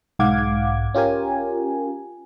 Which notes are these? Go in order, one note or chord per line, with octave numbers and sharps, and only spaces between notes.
B1 G#2 F5 F#5 D6 G#6
C#4 F4 G4 A#4 G#5